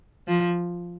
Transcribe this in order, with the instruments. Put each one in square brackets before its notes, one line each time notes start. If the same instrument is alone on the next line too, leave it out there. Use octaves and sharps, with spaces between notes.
[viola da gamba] F3